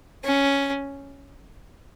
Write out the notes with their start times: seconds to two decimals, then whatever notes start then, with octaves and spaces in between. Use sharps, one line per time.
0.24 C#4